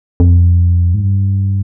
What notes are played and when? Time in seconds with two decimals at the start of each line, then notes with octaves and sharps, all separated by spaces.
0.20 F2
0.94 G#2
1.02 G2